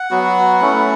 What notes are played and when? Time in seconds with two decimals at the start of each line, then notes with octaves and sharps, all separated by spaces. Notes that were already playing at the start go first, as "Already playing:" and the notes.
Already playing: F#5
0.11 F#3 B3 F#4
0.61 A3 C#4 E4